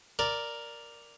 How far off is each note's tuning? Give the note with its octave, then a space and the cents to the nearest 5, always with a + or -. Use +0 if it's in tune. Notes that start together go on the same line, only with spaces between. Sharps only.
A#4 +0 D5 +0